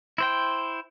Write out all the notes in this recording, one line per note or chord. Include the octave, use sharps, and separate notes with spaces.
E4 C5 G5